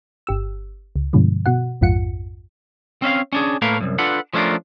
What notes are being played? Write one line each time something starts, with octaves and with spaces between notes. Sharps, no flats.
G1 G4 E6
C#2
G2 B2 D3 F3 G#3
B2 F#4 F#5
A#1 F2 G#2 F4 F#5 C#7
C4 C#4 E5 F5
C#4 D4 G#4
A2 A3 A#3 A#4 B4 F5
C2 F#2
D4 F4 A4 B4 F#5
F3 A3 C#4 D4 F4 A#4